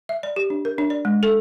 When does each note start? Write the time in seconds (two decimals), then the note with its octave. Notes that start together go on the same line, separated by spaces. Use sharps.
0.09 E5
0.23 D5
0.36 G4
0.50 D4
0.65 A#4
0.78 D4
0.90 D5
1.05 G#3
1.23 A4